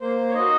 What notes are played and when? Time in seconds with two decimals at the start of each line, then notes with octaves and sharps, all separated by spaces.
0.01 A#3 C5
0.29 C#5
0.34 D#4 F#4 D#5